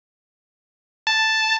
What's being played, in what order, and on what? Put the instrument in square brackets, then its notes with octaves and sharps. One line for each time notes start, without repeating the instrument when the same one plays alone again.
[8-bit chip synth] A5